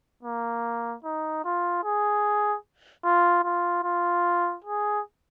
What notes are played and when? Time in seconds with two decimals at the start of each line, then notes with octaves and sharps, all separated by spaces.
0.23 A#3
1.04 D#4
1.45 F4
1.84 G#4
3.04 F4
3.44 F4
3.84 F4
4.64 G#4